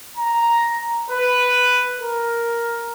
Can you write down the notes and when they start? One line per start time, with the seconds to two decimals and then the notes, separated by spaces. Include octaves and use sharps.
0.17 A#5
1.10 B4
2.01 A#4